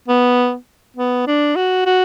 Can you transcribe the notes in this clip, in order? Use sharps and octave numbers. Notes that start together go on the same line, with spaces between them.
B3
B3
D4
F#4
F#4